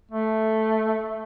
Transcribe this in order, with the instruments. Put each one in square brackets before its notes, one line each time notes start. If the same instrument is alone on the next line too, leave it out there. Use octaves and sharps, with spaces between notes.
[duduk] A3